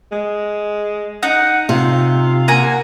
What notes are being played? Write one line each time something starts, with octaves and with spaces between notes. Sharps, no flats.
G#3
D#4 F#5
C3 F4
A#3 F#5 G#5 A#5